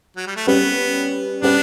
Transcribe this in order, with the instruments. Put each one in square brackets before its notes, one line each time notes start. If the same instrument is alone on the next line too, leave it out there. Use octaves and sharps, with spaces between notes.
[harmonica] F#3
G3
A3
[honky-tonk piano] G3 C#4 G4 B4 [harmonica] B3
[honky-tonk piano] G3 C#4 G4 B4 [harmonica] B3 D4